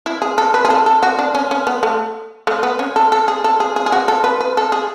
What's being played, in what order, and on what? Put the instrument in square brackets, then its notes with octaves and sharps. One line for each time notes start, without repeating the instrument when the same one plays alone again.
[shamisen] E4
G#4
A4
B4
G#4
A4
A4
F#4
D4
C#4
C#4
B3
A3
A3
B3
C#4
A4
A4
G#4
A4
G#4
G#4
G#4
F#4
A4
B4
B4
A4
G#4